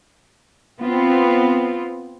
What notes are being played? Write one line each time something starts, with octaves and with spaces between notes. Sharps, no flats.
B3 C4 F4